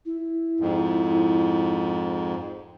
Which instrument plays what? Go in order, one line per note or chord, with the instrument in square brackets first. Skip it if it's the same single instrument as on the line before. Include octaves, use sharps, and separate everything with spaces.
[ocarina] E4
[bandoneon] F2 G#2